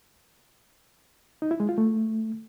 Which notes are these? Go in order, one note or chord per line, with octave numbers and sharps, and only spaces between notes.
D#4
E4
G#3
F4
A3